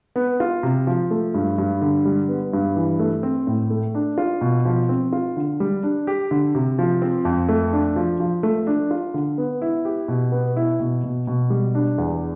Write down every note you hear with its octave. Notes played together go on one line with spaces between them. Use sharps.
B3
F4
C3
F3
A3
G2
G2
D3
G3
B3
G2
E3
A3
C4
A2
A3
D4
F4
B2
F3
C4
F4
D3
G3
D4
G4
D3
C3
F3
C4
F2
A3
D4
F3
F3
A3
D4
F4
D3
B3
E4
G4
B2
B3
E4
B2
B2
B2
G3
D4
E2